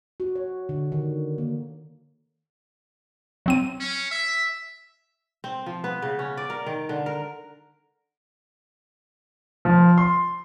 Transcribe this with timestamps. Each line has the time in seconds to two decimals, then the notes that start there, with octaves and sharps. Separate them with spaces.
0.20 F#4
0.35 C#5
0.69 D3
0.92 D#3
1.38 A#3
3.46 F#3 C4 D#7
3.80 C#4
4.11 E5
5.44 C4
5.66 F3
5.84 B3
6.02 C#3
6.19 C#4
6.37 D5
6.50 A#4
6.66 D#3
6.89 D3
7.06 A#4
9.65 F3
9.98 C6